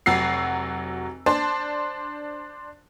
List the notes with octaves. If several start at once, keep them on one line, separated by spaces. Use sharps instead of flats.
F1 F#3 F#4 E6 C7
D4 C5 A5